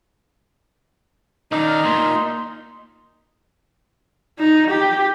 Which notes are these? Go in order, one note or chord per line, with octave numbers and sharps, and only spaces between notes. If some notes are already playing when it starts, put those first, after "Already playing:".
D#3 D#4 D5 A#5
F6
D#2 A#2 C6
D#4
G4